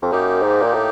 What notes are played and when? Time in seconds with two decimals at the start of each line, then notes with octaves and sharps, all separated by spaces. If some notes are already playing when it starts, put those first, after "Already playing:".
0.02 F2
0.12 F#2 A#3 D#4 G4
0.42 G#2
0.62 A#2
0.74 A2